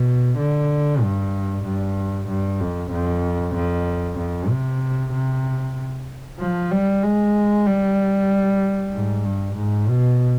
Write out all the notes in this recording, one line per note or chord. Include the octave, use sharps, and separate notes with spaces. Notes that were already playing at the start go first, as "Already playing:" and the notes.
Already playing: B2
D3
G2
G2
G2
F2
F2
F2
F2
C3
C3
F3
G3
G#3
G3
G#2
G2
G#2
B2